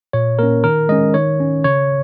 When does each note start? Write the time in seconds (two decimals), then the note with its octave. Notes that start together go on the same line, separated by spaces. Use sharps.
0.13 A#2 C#5
0.39 A#3 C#4 A#4
0.64 D#3 A#4
0.89 G#3 C#4 D#5
1.14 D#3 C#5
1.40 C#4
1.64 C#3 C#5